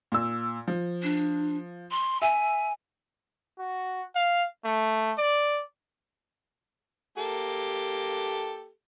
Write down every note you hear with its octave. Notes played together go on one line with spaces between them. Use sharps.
A#2 E6
F3
D4
C6
E5 G#5
F#4
F5
A3
D5
A#3 G4 A4